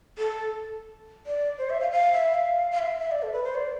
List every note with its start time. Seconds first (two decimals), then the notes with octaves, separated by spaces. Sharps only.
0.18 A4
1.27 D5
1.58 C5
1.70 E5
1.81 F5
1.92 F5
2.13 E5
2.35 F5
2.71 F5
2.79 E5
3.00 E5
3.11 D5
3.23 A4
3.33 B4
3.44 C5
3.55 D5